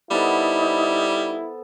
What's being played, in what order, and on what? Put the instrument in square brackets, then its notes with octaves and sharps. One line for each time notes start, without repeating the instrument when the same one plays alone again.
[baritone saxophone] G3 [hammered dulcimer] B3 A4 C5 [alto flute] D#4 [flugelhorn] E4